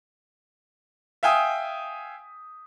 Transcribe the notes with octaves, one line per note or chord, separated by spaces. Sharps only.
E5 F5 G5 G#5 D#6